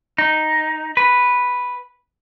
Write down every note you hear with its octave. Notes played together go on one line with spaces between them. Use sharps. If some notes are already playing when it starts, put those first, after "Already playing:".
D#4
B4